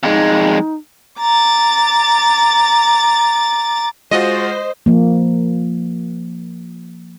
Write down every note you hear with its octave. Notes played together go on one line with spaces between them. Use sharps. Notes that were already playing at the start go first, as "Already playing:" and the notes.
F2 G#3 D#4
A#5 D6 A6
G#3 F4 F#4 C5 D#5
F3 A#3